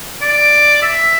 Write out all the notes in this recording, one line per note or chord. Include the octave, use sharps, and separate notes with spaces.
D5
E5